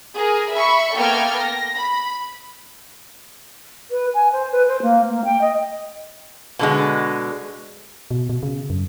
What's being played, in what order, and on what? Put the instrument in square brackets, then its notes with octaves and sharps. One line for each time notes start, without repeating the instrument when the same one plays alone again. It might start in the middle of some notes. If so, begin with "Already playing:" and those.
[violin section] G#4 A#4
E5 B5 C#6
A#3 B3 A4 G5 F6 G#6
A#6
B5
[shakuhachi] B4
G#5
C5
B4
C5
A#3
A#3
G5
D#5
[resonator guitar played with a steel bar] B2 D3 G#3
[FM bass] B2
B2
C#3
F#2